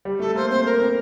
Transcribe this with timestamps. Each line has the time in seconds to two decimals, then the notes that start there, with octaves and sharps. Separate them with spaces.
0.05 G3
0.20 A3 A4
0.35 A#3 C5
0.50 C4 C5
0.65 A#4
0.80 C4